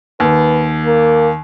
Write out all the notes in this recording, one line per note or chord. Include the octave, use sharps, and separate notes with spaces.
D#2 B4
A#3